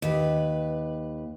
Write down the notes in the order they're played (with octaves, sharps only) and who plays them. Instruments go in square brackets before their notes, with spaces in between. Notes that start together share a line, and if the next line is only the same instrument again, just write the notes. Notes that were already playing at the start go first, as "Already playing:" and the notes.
[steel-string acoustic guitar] D#2 B4